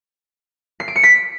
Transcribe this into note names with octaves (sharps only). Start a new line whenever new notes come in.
C7
D7
C#7
B6